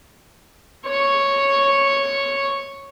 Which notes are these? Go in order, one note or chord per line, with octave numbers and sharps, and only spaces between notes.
C#5 C#6